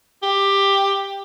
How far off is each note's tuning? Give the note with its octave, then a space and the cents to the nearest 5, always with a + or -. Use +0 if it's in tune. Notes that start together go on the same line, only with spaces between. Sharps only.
G4 +10